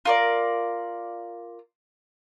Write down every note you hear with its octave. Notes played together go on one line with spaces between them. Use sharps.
F4 A#4 D5